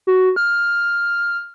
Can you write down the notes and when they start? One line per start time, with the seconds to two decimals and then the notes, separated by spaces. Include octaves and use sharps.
0.07 F#4
0.36 F6